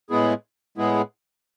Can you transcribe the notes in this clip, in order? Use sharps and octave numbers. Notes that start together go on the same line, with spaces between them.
A2 G#3 B3 E4 G#4
A2 G#3 B3 E4 G#4